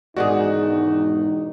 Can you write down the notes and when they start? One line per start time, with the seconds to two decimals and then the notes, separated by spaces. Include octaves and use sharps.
0.16 E1 G#2 D#3 D#4 F#4 G#4 D5 F#5